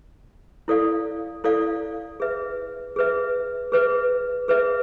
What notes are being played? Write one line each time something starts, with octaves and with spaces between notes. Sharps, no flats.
E4 A4 D5 F5
E4 A4 D5 F5
G#4 B4 E5
G#4 B4 E5
G#4 B4 E5
G#4 B4 E5